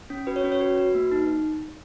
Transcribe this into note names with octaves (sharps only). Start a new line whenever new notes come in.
C#4
F#4 B4
C#5
C#4 B4
C#5
F#4 B4
F#4
A#3
D#4